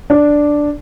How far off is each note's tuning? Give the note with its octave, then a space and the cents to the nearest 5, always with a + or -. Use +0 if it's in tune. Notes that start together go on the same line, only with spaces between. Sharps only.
D4 +0